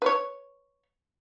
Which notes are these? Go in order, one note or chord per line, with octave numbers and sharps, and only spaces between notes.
B4 C#5